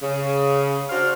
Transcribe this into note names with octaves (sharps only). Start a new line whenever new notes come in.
C#3
D4 F#4 C5 F5